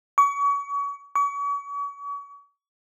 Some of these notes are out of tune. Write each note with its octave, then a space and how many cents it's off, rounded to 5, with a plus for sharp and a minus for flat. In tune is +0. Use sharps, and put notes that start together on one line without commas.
C#6 +35
C#6 +40